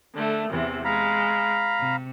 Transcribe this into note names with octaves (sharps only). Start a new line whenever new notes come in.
D3 A3
E2 C3 E3
G#3 F5 A#5 B5
C3